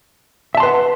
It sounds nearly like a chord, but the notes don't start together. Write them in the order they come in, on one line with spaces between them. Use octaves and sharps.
E5 A5 C6 B4 F#5